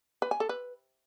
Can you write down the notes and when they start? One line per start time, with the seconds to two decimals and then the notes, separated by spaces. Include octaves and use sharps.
0.22 B4
0.31 G#5
0.40 A4
0.49 B4